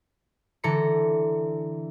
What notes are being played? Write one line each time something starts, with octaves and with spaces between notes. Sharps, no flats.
D3 E3 A4 A#5 C#7